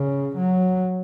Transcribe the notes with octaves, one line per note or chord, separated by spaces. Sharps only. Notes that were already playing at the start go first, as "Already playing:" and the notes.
Already playing: C#3
F#3